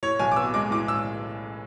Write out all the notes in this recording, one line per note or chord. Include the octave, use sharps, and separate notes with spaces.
A2 C#5
B1 G#5
D6
B3 E6
G#3 D6
A2 D6
E6